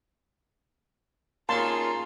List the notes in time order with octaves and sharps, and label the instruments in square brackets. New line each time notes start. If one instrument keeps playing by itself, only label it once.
[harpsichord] A#3 C#4 D#4 [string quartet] F4 G#4 A#5 [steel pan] A5 C6